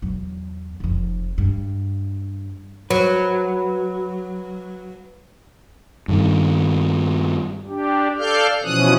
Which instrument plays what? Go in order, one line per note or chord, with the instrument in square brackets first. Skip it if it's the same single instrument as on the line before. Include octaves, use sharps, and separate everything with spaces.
[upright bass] E2 F#3
F1 F2
G2
[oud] F#3 [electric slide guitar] B4
[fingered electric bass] G2 D#3
[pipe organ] D4 G4
A4 D5 F5 F6 G6
B2 E3 F3 C#4 D#6 F#6